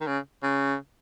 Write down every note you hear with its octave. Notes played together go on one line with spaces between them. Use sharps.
D#3
C#3
C#3